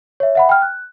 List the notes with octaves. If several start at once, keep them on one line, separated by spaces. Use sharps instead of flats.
C#5 E5
E5 F#5 B5
G5 F6
F#6